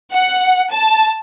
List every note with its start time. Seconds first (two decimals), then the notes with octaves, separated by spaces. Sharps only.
0.11 F#5
0.70 A5